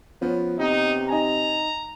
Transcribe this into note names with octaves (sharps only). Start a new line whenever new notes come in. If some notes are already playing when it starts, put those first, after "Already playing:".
F3 B3 C#4
C3 D#4
D#4 G#5 A#5